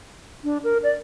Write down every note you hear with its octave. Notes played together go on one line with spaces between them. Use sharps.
D4
A#4
D5